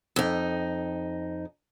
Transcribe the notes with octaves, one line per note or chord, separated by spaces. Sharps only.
F2 D#4